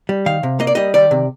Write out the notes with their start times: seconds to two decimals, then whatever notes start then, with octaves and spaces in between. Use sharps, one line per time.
0.09 G3
0.26 D#3 F5
0.43 C3
0.60 A#3 D#5
0.67 D5
0.75 G3 D#5
0.94 D#3 D5
1.11 C3